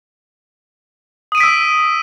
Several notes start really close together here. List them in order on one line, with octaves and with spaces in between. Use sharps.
D#6 D#7 D7 B6 E6